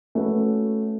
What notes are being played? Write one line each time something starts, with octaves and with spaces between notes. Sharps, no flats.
A3 C#4 F#4 B4